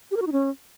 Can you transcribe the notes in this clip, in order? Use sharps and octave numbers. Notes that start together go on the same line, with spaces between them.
G4
A#4
F#4
D#4
C#4